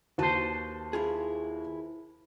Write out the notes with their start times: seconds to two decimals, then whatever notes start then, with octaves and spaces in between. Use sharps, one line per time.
0.18 D#2 F#4 B4 C5 A5
0.93 E4 F4 G#4